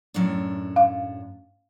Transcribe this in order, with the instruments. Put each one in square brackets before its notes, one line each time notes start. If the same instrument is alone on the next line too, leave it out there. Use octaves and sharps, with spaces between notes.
[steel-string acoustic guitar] F#2 A2 D4
[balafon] F5